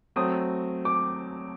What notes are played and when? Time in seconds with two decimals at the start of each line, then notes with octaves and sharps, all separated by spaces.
0.16 F#3 A3 C4 D#6
0.85 D6